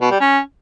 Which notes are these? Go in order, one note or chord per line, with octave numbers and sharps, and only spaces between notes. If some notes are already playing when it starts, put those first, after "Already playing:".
B2
G3
C#4